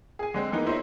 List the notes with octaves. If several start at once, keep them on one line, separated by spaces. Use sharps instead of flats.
G#4 G#5
D3 G#3 C4
E3 A#3 B3 D#4 B4
D#4 E4 C5 C#5 D#5 E5